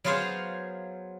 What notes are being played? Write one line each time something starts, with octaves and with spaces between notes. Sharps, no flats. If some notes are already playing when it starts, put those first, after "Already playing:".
F#3 B3 F4 G#4 C5 F5